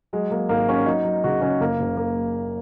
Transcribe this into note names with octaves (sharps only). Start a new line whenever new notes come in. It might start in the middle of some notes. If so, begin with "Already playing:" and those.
F#3 G#3
F#3 A#3
G#1 A#3
F#3 C#4
F#3 D#4
F#3
C#3 F#4
C#3 C#4
F#1 A#3
F#1
A#3